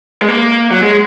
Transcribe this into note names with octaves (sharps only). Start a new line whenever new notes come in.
G#3
A#3
F#3
G#3